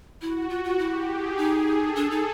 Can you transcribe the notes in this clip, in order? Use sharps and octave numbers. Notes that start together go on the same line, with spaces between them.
E4 F#4
F4
F4
E4 G4
G#4
D#4
A4
D4
D#4